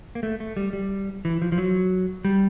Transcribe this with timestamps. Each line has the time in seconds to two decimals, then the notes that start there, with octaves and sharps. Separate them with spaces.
0.15 A#3
0.23 A3
0.40 A3
0.57 G3
0.73 G3
1.25 E3
1.42 F3
1.52 F3
1.58 F#3
2.25 G3